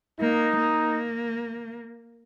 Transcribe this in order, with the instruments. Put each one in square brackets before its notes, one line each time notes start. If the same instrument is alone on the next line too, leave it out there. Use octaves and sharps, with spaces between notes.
[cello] A#3 [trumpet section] D#4
[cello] A#3